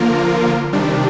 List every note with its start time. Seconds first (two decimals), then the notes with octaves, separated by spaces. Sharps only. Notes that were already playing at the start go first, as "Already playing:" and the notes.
Already playing: D3 F3 A#3 F4 A#4
0.72 C3 D#3 G3 D4